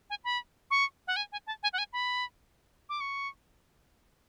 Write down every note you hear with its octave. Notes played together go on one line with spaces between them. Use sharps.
G#5
B5
C#6
F#5
G#5
G#5
A5
G#5
F#5
G#5
B5
D6
C#6